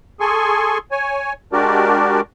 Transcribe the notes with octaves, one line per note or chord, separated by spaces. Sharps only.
G#4 A4 G#5 C6 C#6
C#5 G#5
G#3 D4 F#4 G4 A#4 D5